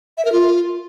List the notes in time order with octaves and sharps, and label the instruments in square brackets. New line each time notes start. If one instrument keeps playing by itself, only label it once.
[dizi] E5
A#4
F4